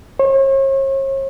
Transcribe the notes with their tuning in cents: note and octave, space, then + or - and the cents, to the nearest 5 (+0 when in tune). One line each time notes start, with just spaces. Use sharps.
C#5 -40